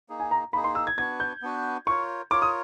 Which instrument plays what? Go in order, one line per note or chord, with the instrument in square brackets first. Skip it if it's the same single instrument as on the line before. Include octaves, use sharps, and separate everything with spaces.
[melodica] A#3 D#4 G#4
[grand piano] G#5
A#5
[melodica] A#3 [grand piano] B5
[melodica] D#4 G#4
[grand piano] C6
E6
G#6
[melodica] B3 D4 F#4 B4 [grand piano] G#6
[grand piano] G6
[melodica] B3 D4 F#4 B4
[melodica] F4 A#4 C#5 [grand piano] C#6
[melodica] F4 A#4 C#5 [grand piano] D6
[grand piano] D#6